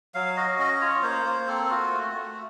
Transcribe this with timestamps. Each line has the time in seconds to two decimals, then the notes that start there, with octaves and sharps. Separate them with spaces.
0.14 F#3 F5
0.36 F#4 D#5
0.59 C#4 D#5
0.81 F4 C#5
1.03 A#3 C5
1.26 A#3
1.47 C4 A4
1.70 F4 F#4
1.92 A3
2.14 A3